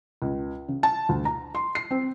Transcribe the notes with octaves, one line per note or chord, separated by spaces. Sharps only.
C#2
C#3
A5
D2
A#5
C6
C7
C4